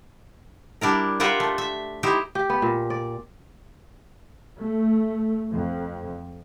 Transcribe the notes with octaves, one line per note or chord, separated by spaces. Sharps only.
G3 D4 E4 A#4
F4 G4 A#4 C5 E5 F#5
A3
E5
D#4 E4 G4 C5
G4
B3
A#2
D5
A3
F2